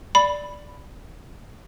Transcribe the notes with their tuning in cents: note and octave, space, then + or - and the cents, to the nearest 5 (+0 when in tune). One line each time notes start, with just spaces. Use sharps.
D5 +0 B5 +0